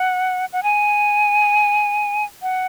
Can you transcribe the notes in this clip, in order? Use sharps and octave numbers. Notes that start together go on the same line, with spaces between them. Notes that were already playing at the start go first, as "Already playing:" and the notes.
Already playing: F#5
F#5
G#5
F#5